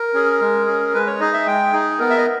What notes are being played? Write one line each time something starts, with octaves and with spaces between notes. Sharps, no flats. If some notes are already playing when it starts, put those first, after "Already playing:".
Already playing: A#4
C#4 G#4
G#3
C#4 G#4
G#3 B4
C#5
D#4 G#4 D#5
E5
G#3 G5
D#4 G#4
B3 A#4
E5
D#5